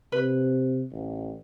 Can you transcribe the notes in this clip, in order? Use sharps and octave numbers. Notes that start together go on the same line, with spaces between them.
C3 B4
A1